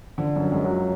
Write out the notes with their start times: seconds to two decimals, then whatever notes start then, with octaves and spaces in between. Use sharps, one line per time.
0.18 D3 F3
0.36 F#2
0.44 F#3
0.52 F#2 G#3
0.65 F#3
0.70 F3